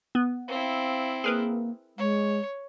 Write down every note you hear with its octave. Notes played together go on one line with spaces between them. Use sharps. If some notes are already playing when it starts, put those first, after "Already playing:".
B3
C4 E4 F5
A#3 G#4 A#4 B4
G#3 C#5